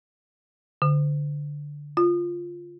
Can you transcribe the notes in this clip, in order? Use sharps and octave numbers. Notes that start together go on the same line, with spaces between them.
D3
F4